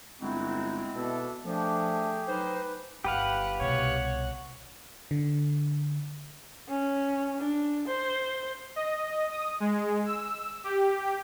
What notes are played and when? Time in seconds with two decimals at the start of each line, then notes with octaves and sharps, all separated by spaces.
0.22 G1 G#3 C4 D#4 E4 F#4
0.95 B2 D4 A4 E5
1.46 F3 A3 D4 G4 G#4 D6
2.28 F#3 D#4 B4 C5
3.04 G1 G4 B4 F5 F#5 F#6
3.61 C2 B2 C#5 F#5 F#6
5.11 D3
6.69 C#4
7.40 D4
7.88 C5
8.76 D#5
9.31 D#6
9.60 G#3
10.06 E6
10.64 G4